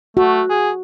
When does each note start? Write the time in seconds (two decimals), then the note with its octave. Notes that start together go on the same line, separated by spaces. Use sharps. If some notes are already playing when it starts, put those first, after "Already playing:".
0.17 A3 F#4
0.50 G#4